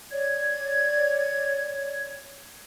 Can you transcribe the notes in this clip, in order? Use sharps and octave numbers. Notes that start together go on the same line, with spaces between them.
C#5 D5 G#6